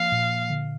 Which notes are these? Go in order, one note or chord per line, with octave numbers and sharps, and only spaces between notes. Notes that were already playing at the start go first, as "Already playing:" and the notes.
Already playing: F3 A#3 F5
A#2
D3